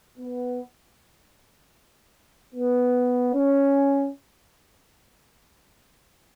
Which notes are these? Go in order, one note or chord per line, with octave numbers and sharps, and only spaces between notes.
B3
B3
C#4